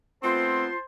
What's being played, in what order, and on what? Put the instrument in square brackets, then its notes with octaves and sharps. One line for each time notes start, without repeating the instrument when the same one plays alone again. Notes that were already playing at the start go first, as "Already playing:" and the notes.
[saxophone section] A3 B3 C4 [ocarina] F4 [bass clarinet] C5 [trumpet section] A5 C6